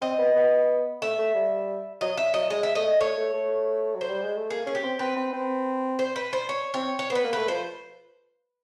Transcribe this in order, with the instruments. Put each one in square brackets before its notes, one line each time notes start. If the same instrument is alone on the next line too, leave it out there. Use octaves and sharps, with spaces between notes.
[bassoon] C4 [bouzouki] D#5
[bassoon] B3
B3
[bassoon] A3 [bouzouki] E5
[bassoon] A3
G3
[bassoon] F#3 [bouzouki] D#5
[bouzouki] E5
[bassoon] F#3 [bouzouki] D#5
[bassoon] G#3 [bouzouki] D#5
[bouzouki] E5
[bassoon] A3 [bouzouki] D#5
[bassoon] A3 [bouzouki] C#5
[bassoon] A3
A3
F#3
[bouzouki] C5
[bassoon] G3
G#3
A3
[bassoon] A#3 [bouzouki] G#4
[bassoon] C#4 [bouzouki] G#4
[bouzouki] G4
[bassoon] C4
[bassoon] C4 [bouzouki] B4
[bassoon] C4
C4
[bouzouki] C5
B4
C5
C#5
[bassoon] C4 [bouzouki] C#5
[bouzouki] C#5
[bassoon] B3 [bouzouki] C5
[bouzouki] B4
[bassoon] A#3
[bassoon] A3 [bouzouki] B4
[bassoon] F3 [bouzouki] C5